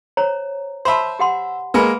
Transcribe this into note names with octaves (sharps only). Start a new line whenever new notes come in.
C5 C#5 A#5
C5 E5 A5 B5 C6
G4 F#5 C6
G#3 A#3 B4 G#5 B5